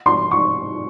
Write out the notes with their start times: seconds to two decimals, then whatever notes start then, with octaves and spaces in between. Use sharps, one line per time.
0.06 C6
0.31 C#6